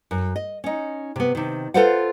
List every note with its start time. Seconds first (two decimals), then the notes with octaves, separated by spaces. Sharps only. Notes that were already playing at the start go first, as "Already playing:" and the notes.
0.11 F#2
0.36 D#5
0.64 C#4 D#4
1.16 C3 B3
1.35 C3 D#3
1.74 F4 A4 B4 C5 F5 F#5